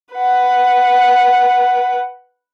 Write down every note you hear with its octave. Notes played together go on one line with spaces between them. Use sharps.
B4 F#5